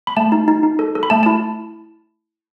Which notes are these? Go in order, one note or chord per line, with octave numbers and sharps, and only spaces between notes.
B5
A3 A5
D#4
D#4
D#4
A4
A4
B5
A3 A5
E4 A5